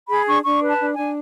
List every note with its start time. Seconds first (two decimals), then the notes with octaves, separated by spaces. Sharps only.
0.09 G#4 B5
0.27 D4 C#6
0.44 D4 C#6
0.61 B4
0.68 A5
0.79 D4
0.92 G#5
0.98 D4